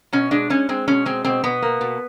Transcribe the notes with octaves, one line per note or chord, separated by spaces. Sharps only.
B2 C#4
G#3 D4
G#3 C#4
G#3 C4
B2 C#4
G#3 C4
B2 C4
B2 B3
A#3
B2